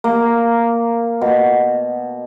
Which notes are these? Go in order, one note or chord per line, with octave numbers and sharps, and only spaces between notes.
A#3
B2